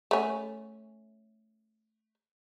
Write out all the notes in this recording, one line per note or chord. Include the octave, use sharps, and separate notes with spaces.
A3 C#4